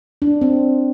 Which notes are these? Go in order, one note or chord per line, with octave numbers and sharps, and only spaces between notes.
D4
C4